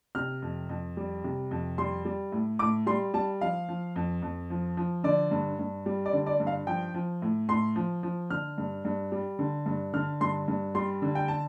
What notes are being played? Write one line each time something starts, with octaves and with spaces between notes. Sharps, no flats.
C3 F6
F2
F2
G3
C3
F2
G3 C6
G3
A2
A2 D6
G3 C6
G3 A5
F3 F5
F3
F2
F2
F3
F3
D3 D5
G2
G2
G3
D5
D3
D5
G2
F5
F3 G5
F3
A2
A2 C6
F3
F3
D3 F6
G2
G2
G3
D3
G2
D3 F6
G2 C6
G2
G3 C6
D3
G5
A5